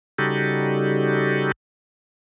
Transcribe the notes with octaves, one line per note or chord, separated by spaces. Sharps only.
C#3 G3 D#4 F#4 G4 A4